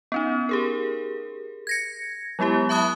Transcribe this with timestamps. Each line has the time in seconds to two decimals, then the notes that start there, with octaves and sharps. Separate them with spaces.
0.12 B3 C#4 D#4
0.49 G4 G#4 A#4
1.67 G#6 A#6 C#7
2.39 F#3 G#3 B3 E4 G4
2.69 E5 A5 B5 D#6 F#6